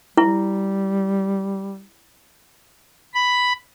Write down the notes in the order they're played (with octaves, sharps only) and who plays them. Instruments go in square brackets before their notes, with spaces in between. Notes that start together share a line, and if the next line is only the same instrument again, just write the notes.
[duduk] G3 [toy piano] E4
[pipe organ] B5